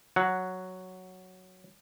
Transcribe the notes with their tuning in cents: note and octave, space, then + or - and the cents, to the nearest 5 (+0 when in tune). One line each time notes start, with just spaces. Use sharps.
F#3 +0 F#5 +0